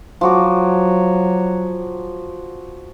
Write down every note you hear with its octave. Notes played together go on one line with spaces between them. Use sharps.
F3 F#3 F#4 D6